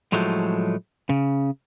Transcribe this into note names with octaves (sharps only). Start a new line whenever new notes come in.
A2 F3 F#3 G#3 A3
C#3